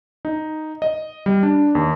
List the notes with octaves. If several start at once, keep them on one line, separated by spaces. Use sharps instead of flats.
D#4
D#5
G3
D4
D#2